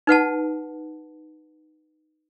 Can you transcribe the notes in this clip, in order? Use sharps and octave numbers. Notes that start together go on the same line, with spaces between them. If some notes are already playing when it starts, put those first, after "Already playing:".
D#4 B4 F#5 A5